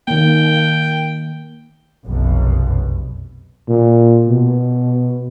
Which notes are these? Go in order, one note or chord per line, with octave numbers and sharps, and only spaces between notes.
D#3 A#3 G5
F1 B1 F#2 B2
A#2
B2